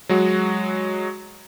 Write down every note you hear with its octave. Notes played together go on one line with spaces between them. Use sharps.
F#3 G#3 F#4